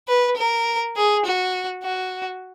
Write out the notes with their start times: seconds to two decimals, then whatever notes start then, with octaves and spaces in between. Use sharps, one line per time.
0.08 B4
0.37 A#4
0.96 G#4
1.25 F#4
1.83 F#4